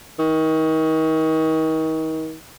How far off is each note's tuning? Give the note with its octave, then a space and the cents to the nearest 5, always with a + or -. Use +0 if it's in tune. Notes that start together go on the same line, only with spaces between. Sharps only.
D#3 +35